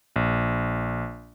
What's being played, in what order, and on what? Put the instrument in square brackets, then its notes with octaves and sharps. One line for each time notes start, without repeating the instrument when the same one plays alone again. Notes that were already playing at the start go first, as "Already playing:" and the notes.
[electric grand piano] A#1